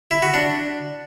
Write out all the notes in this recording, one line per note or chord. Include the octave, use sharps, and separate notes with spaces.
E4
F#4
D4